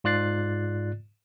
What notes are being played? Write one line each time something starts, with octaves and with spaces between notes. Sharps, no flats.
G#2 F4 D5 F#6 A6 C7